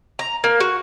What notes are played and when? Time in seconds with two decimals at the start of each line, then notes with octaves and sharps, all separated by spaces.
0.19 A#5
0.44 A#3
0.60 F#4